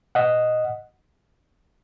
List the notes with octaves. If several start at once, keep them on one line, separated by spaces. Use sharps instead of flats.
D#5 F#5